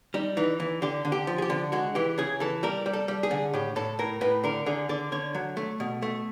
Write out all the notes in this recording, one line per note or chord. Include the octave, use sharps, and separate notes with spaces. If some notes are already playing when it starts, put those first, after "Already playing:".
G3 D#4
E3 D#4
E3
D3 G4
D3
G4
F3
G#4
G4
D3
G#3 F#4
E3 G4
C#3 G#4
E3 A4
G3 A#4
G3
A4
G3
G#4
D3
A2 G4
A2 A4
A2 A#4
A2 B4
D3 A#4
D3 G#4
D3 D5
D3 C#5
F#3
A3
B2
A3